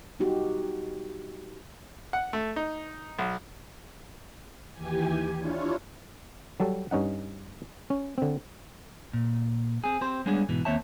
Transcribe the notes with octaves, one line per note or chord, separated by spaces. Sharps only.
G3 B3 D#4 F#4 G4
F#5
A3
D#4
B1
D#2 E3 G4 G#5
D4 E4 F4 C#5
F#3 G3 A4
G2 C#4 D#4 F#5
C#4
D3 C4
A#2
C4 G#4
C4 G4 C5
G3 G#3 B3 C#4 D4 G#4
G#2 B2 E3
D#2 A#3 C4 C#5 E5 A5